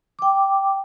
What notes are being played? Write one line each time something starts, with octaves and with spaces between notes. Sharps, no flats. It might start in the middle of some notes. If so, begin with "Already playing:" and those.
G5 D6